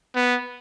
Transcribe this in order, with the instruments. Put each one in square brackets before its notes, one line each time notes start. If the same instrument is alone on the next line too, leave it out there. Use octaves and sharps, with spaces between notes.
[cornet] B3